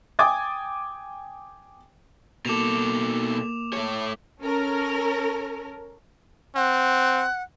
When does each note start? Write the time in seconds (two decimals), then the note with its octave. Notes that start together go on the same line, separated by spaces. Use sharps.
0.19 G5 G#5 D6 D#6 G#6 A6
2.46 B2 A#3 A4 D6 E7 F7
3.73 A3 C#5
4.41 C#4 A4 A#4
6.56 C4 F#5